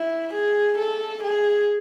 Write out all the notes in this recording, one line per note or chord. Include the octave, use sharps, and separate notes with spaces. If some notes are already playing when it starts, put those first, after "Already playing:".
Already playing: E4
G#4
A4
G#4